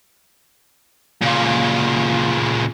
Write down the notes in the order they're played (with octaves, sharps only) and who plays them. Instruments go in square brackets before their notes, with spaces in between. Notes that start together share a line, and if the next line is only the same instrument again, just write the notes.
[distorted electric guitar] A#2 C#3